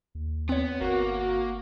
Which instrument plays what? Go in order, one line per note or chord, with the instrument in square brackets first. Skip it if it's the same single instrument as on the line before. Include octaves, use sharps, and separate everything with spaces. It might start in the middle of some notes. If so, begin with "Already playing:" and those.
[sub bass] D#2
[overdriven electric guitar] B3 [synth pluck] C4 C#5
[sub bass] G1 [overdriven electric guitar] A#3 [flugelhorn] F#4
[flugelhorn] F#4